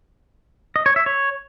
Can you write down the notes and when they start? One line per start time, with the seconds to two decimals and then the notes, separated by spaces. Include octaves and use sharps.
0.76 D#5
0.86 C#5
0.96 E5
1.06 C#5